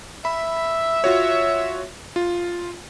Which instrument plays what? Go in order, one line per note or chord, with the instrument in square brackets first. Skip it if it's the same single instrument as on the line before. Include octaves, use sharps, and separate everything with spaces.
[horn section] E5 [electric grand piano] B5
[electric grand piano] F4 F#4 C#5
F4